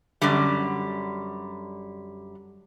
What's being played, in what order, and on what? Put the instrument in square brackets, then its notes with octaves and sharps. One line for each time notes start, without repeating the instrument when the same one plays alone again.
[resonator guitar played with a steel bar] F#2 D3 G3